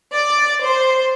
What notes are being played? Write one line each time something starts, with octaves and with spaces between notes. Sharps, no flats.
D5
C5